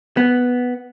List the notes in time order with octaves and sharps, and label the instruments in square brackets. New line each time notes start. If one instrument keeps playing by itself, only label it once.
[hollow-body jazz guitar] B3